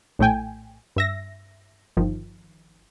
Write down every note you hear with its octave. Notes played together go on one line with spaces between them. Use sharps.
A#1 A2 A3 G5 G#5
G2 E5 A#6
G1 D#3 F3